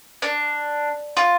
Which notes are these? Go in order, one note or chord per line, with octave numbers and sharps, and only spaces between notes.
D4
F4